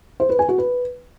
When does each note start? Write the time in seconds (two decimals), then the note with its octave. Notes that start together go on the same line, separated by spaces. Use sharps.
0.20 C5
0.29 B4
0.39 G#5
0.49 F#4
0.58 B4